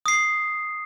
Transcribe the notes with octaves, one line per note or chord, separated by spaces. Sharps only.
D#6 C7